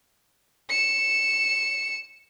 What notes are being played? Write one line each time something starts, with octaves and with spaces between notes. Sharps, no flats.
C#7 E7